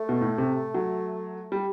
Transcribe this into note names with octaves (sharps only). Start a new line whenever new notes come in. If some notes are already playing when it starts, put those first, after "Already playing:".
Already playing: A3
B2
A2
C3
F#3
G3